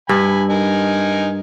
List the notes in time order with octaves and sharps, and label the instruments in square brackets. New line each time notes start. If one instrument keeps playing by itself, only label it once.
[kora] G2 [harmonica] G#5 B5
[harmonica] D#4 A#4 G#5